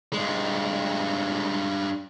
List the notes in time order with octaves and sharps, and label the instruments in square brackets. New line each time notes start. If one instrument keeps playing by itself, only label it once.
[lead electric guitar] G2 G#3